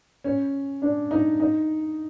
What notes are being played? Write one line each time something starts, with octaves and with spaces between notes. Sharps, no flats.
C#4
D4
D#4
D#4